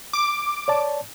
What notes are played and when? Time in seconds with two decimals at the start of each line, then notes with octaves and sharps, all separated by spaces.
0.13 D6
0.68 C#5 D5 A5